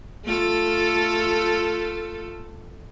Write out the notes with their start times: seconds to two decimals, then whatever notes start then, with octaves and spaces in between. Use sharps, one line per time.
0.25 A3 F4 A4